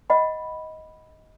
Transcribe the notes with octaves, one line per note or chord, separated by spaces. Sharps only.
D#5 F#5 B5